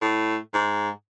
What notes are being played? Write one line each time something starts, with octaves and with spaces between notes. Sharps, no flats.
A2
G#2